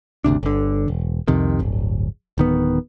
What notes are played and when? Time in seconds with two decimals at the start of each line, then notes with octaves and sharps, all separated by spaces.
0.24 G1 D2 C3 D4
0.43 G1 D3
0.88 E1
1.28 C2 F2 C3 D#3
1.59 D1 G1
2.38 D1 D#3 B3